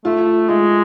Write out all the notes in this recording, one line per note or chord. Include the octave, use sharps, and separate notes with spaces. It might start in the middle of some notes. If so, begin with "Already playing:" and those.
A3 F4
G#3 F4